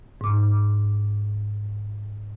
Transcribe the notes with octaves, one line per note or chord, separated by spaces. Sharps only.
G#2 D6